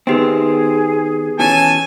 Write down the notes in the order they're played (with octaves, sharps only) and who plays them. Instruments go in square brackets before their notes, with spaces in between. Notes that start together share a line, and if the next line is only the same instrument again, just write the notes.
[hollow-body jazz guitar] D#3 C4 [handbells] B3 G4 B4 [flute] G#4
[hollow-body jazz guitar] B2 E3 C#4 [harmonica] G#5 A5